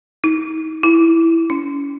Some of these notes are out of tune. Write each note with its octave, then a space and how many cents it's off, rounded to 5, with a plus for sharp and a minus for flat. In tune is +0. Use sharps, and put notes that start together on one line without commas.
D#4 +35
E4 +0
C#4 +35